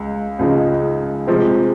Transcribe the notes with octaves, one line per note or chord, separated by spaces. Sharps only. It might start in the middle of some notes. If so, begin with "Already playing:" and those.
Already playing: C#2 G#3
C#2 C#3 F3 G#3 D#4
C3 F3 G#3 C4